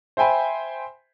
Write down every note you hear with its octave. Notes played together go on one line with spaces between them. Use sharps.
C5 E5 G5 G#5 B5